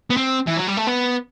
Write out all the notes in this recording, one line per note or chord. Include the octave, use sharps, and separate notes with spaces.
B3
C4
E3
F#3
G3
A3
B3